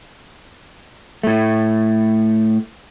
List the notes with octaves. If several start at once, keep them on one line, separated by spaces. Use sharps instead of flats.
A2 A3